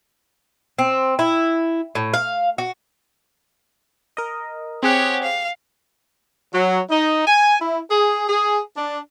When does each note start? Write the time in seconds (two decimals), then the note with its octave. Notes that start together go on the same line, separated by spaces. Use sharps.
0.79 C4
1.19 E4
1.95 A2
2.14 F5
2.58 F#4
4.17 A#4 D#5
4.83 C4 G4 G#4 C#5 F#5
5.23 F5
6.53 F#3
6.89 D#4
7.26 G#5
7.60 E4
7.90 G#4
8.28 G#4
8.75 D4